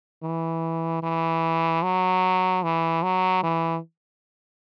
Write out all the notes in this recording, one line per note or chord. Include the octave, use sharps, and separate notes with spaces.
E3
E3
F#3
E3
F#3
E3